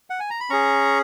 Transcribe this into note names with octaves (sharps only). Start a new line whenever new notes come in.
F#5
G#5
A#5
B5
C#4 G#4 A#5 C#6